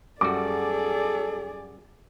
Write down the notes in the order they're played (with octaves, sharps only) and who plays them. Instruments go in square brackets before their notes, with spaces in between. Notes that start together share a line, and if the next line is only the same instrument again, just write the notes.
[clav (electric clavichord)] F#2 G3 F#4 [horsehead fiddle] G#4 D5 [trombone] A4 [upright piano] D6